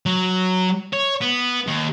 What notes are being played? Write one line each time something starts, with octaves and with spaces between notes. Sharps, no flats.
F#3
C#5
B3
D#2